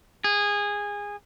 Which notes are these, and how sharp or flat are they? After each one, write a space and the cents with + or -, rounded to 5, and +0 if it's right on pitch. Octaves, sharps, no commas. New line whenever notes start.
G#4 -20